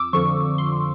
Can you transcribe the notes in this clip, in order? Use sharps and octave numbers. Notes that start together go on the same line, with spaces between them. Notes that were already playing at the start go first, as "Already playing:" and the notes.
Already playing: F2 D6 E6
F2 D3 F3 C#6
C6